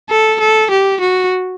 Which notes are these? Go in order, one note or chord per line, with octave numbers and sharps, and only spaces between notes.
A4
A4
G4
F#4